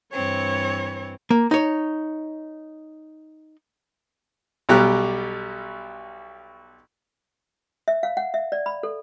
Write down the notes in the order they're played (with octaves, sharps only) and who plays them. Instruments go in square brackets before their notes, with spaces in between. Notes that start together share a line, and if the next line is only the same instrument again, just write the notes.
[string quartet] G2 E3 C4 [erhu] C#5
[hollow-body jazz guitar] A#3
D#4 C#5
[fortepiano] B1 B2 G3 G4 A#5 F#6
[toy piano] E5
F5
F#5
E5
D5
B5
A4